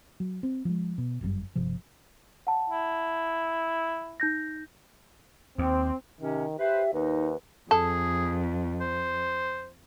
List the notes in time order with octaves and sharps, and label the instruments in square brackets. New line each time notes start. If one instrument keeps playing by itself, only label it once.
[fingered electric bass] F#3
C4
F3 G#3
B2
G1 F#2 C3 G3
G1 C3 F3
[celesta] F#5 A5
[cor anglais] E4
[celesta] D#4 G6 A#6
[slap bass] D#2 [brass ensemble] C4
[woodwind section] C3 C#4 [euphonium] D#3
[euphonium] G4 [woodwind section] B4 C5 [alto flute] E5
[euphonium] D#2 [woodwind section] D#4 [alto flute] B4
[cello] F2 [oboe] G#4 [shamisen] A4
[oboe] C5